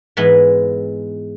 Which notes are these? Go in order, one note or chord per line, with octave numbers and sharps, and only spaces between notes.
G#2 E3 G#3 B3